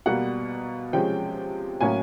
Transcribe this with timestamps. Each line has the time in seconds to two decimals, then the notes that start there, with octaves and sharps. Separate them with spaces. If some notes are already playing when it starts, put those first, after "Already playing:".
0.06 B2 G3 A#3 F#5
0.93 C3 F3 G#3 C#4 G5
1.81 A2 F#3 A#3 C#4 G#5